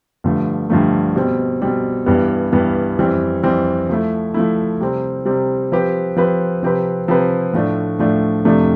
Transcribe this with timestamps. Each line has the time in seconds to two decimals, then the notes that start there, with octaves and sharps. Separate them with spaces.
0.24 G2 D3 F3 A3
0.70 G2 D3 F3 A3
1.16 B2 G3 C4
1.62 B2 G3 C4
2.06 G2 E3 G3 B3
2.53 G2 E3 G3 B3
2.98 F2 E3 G3 C4
3.43 F2 E3 G3 C4
3.89 F3 A3 E4
4.34 F3 A3 E4
4.80 C3 G3 C4
5.25 C3 G3 C4
5.72 F3 C4 G4 B4
6.17 F3 C4 G4 B4
6.63 C3 F3 C4 G4 B4
7.08 C3 F3 C4 G4 B4
7.53 A2 F3 A3 D4
7.99 A2 F3 A3 D4
8.45 F2 C3 F3 A3 D4